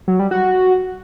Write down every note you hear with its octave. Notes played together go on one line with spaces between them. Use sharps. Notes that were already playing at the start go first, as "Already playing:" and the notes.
F#3
G3
F#4